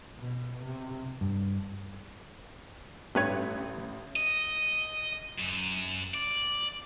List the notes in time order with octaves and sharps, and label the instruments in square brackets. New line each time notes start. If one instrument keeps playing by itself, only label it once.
[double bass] B2
C3
[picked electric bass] G2
[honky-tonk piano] A1 [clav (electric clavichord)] G2 B4 C#5
[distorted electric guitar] D#5
F#2
D5